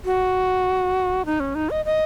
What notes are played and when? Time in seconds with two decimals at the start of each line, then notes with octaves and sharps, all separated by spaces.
0.05 F#4
1.26 D#4
1.40 C#4
1.55 D#4
1.70 D#5
1.85 D#5